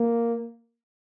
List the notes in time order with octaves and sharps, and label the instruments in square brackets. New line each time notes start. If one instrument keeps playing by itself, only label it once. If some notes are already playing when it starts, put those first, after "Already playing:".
Already playing: [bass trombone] A#3